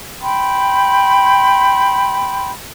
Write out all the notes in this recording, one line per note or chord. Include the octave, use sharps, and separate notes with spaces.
G5 B5 C6 G6